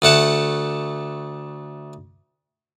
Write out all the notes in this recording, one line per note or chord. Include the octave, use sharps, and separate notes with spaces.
D2 A3 F#5 A5